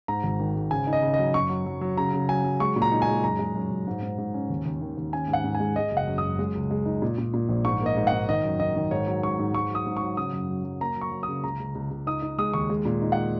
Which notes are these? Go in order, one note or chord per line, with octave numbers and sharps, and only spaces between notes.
G#2 A#5
G#1
D#3
G#2
C#3 G#5
D#4
D#5
C#3
D#5
F#3
F#2 C#6
F#3
F#3
F#3
C#3 A#5
C#3
F#3 G#5
F#3
G#3 C#6
A#2
A#5
D#4
G#5
G#3
F#2 A#5
G#3
F#2
F#2
G#2
G#2
G#2
C#4
D#2
D#2
D#3
D#2
C#4 G#5
G#2
F#5
G#2
G#5
G#3
G#3 D#5
F#1
F#5
F#2
D#6
F#2
G#3
C#2
G#3
D#4
A#2
A#2
A#2
A#1
G#2 C#6
A#3 D#5
G#2
F#5
G#2
D#3 D#5
F#2
D#3 D#5
D#3
G#2 C#5
F#3
G#2 C#6
G#2
G#2 C#6
F#3 D#6
G#2
C#6
F#3
C#3 D#6
F#2
F#3
F#3
A#3 A#5
F#3
C#6
F#3
C#3 D#6
C#2 A#5
C#2
C#2
C#2
D#4 D#6
D#4
G#3 D#6
D#2 C#6
G#3
A#2
D#4
F#5